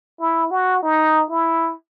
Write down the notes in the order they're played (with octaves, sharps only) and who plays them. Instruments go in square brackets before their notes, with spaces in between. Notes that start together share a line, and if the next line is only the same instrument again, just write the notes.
[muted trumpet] E4
F#4
D#4
E4